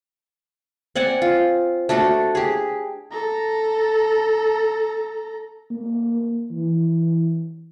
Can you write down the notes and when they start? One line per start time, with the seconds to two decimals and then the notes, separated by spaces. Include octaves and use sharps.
0.96 C4 D5 F#5 G#5
1.22 F4
1.89 A3 D4 F#4 A4
2.35 G4 G#4
3.12 A4 A#5
5.71 A#3
6.52 E3